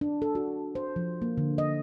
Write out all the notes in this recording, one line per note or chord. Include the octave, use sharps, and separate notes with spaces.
D4
A4
F#4
C5
F3
A#3
D3
D#5